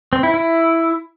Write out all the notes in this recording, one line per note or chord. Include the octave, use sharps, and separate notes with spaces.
C4
E4
E4